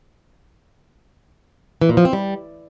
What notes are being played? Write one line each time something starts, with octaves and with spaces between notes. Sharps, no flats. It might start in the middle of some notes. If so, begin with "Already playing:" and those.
E3
A#2
F3
C4
G3